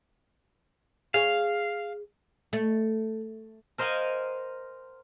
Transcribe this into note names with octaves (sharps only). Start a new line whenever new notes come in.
G#4 C#5 F5
A3
A#4 C5 D#5 F5 F#5 G#5